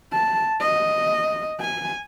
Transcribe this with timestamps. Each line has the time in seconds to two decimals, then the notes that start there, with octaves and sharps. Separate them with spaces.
0.13 A5
0.60 D#5
1.60 G#5